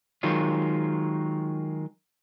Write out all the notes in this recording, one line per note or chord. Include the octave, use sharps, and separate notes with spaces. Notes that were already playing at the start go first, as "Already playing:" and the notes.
D#3 F#3 G#3 F4